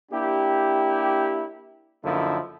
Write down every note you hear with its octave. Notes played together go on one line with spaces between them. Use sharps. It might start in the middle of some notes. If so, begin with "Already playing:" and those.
A#3 D4 E4 G4
F#2 D3 F3 A#3 D#4 E4